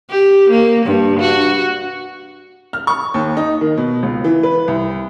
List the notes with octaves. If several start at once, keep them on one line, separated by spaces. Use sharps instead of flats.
G4
A#3
G2
F#4
F6
C#6
D#2
D#4
D#3
B2
C#2
E3
B4
C2